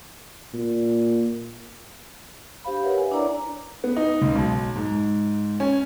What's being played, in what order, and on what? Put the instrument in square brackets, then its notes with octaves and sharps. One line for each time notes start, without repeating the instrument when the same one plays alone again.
[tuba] A#2
[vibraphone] D4 G4 C5 F5 B5
A#4 B4 C#5 E5 F#5
G#5
D4 E4 C#5 D5 A#5
[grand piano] B3
D#4
C#2
B1
G#2
C#4